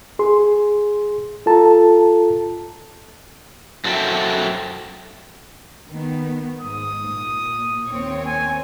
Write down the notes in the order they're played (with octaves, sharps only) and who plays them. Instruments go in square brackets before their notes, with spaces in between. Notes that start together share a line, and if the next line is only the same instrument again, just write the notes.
[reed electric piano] G#4 C6
F4 A4 A5 A#5
[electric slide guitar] F#2 F#4 A4 C5 E5 G5
[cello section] D#3 B3
[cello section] G#2 [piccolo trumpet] D#6
[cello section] A#2
D#2 C4 C#5
[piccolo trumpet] G#5